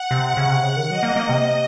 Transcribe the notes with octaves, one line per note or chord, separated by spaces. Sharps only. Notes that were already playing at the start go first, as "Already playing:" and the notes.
Already playing: F#5
C3
C#3
C3
C#3
D#3
F#3 D#5
A#3
A#3
C3